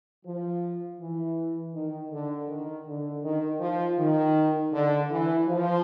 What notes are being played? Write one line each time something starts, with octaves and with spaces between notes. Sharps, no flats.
F3
E3
D#3
D3
D#3
D3
D#3
F3
D#3
D3
E3
F3